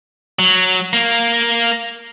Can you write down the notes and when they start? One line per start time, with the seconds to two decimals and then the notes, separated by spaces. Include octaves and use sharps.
0.39 F#3
0.93 A#3